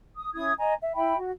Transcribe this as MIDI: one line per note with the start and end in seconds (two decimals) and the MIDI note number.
0.16 0.33 87
0.34 0.52 61
0.34 0.52 64
0.34 0.52 87
0.34 0.52 92
0.58 0.74 75
0.58 0.74 80
0.58 0.74 82
0.81 0.93 76
0.95 1.16 64
0.95 1.16 76
0.95 1.16 79
0.95 1.16 83
1.17 1.30 66